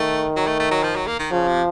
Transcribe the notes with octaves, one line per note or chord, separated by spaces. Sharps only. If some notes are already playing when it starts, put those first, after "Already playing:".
Already playing: D#3 A3
F#3
A3
A3
F#3
F3
F#3
A#3
D#3
C#3 F3
C3